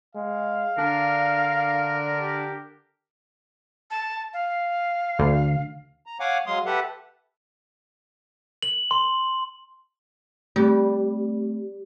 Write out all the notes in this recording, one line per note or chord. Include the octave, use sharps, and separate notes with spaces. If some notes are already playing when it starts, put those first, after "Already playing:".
G#3 F5
D3 D4 A#4
G4
A5
F5
D2
A#5
C#5 F5 F#5 G#5 D6
F#3 G#3 F5 C6 D#6
G4 A4 B4 E5 F#5
F#7
C6
G3 A3 C4